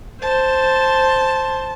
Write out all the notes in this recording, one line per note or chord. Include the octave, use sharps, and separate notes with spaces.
C5 A5